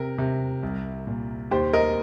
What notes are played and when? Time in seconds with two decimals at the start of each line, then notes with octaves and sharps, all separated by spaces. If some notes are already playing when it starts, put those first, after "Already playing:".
Already playing: C3 A#4
0.18 C3
0.63 C2
1.07 A#2
1.51 D#2 G4 C5
1.73 A#4 D#5